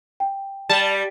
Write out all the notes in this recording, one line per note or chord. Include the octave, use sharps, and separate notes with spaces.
G5
G3 A5